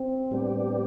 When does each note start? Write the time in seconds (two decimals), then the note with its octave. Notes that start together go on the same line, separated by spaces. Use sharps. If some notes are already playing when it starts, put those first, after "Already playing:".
Already playing: C4
0.31 A2 G3 B3 D4 G4